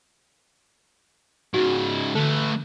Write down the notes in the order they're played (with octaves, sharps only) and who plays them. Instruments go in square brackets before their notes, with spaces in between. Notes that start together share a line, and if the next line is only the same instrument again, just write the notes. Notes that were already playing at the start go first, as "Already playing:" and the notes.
[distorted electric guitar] G#2 C#3 [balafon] F#4
[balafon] D3 [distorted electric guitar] A3 B4